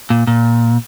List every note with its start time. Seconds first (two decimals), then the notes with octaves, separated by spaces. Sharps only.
0.10 A#2
0.27 A#2